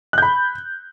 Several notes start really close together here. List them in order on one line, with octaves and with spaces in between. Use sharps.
F#6 G6 B5